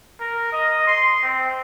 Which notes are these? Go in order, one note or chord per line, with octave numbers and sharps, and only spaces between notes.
A#4
D#5
C6
C4